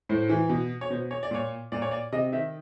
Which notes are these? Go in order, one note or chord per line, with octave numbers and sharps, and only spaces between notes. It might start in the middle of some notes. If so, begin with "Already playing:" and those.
A2 C5
E3
B2
C#5
B2 C5
C#5
D5
A#2 C#5
A#2 D5
C#5
D5
C3 D#5
D#3 E5